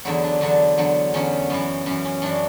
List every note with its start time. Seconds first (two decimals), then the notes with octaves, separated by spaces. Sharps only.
0.05 E2 D3 F#3 E4
0.24 D4
0.41 E2 D3 F#3 D4
0.78 E2 D3 F#3
1.14 E2 D3 F#3 C#4
1.50 F#2 E3 B3
1.86 F#2 E3 C#4
2.05 C#4
2.22 F#2 E3 D4